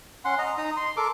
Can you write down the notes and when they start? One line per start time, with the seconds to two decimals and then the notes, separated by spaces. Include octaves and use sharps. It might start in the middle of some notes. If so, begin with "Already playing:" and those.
0.25 C#4 F#5 C6
0.38 D#5 A#5
0.58 D#4 A#5 D#6
0.77 C6
0.97 A4 A#4 D6